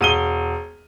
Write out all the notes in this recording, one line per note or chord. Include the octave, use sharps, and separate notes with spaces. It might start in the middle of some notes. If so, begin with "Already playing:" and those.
E1 D#7 G7